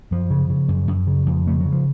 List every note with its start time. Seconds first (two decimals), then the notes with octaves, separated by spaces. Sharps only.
0.11 F#2 F3
0.30 C#3
0.50 C#3
0.68 F#2
0.87 F#2
1.07 C#3
1.26 F2
1.46 C#3 A3
1.60 C#3 F#3
1.72 F3